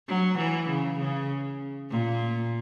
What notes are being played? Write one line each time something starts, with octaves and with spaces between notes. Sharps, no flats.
F#3
E3
C#3
C#3
A#2